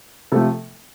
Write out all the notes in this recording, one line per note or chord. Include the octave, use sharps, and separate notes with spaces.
C3 F3 A3 A4